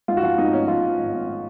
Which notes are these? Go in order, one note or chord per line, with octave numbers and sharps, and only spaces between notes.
G#2 F4
F#4
F3 F4
G#2 D#4
G#1 C#4
F3 F4
F3
G#1
G#1